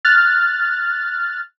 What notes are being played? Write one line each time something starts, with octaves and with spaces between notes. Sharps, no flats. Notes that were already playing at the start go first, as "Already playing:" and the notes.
F6 F#6 A6